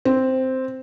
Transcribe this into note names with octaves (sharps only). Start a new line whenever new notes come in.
C4